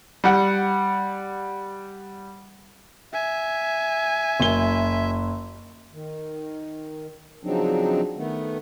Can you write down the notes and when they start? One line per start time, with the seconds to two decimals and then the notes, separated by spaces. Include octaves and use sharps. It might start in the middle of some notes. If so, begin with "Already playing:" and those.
0.24 G3 F#5
3.13 E5 G#5
4.40 F#1 G7
5.93 D#3
7.43 C#3 F3 F#3 C4 D4 D#4
8.16 D#3 A3 B3